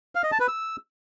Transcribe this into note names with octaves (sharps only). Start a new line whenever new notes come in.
F5
D#5
A5
B4
E6